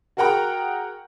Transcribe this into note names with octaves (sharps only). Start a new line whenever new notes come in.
F#4 G#4 A#4 F#5 G5 A#5